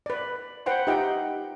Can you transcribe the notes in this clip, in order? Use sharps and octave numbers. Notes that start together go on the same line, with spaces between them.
B4 D5
B4 C5 F#5 G5 C6
D#4 F4 G4 E5 F#5 G5